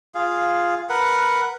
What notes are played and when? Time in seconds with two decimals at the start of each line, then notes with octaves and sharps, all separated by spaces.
0.15 F4 G#4 F5
0.89 A#4 B4 F#5